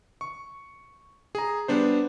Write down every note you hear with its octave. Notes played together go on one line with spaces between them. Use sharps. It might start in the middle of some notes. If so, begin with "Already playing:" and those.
C#6
G#4 A#5
G3 B3 D4 C5